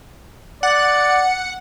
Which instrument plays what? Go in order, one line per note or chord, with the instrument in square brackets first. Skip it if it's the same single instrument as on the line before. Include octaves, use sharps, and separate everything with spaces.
[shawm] D5 [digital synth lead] F#5